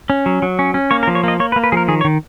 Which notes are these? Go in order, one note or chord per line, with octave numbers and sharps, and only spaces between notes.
C#4
F#3
F#3
C#4
C#4
A#3 C#5
A#4
F3
C#5
A#3 D#5
A#3 C#5
B4
A#3
B4
F3 G#4 A#4
D#3 G#4
C#5
D#3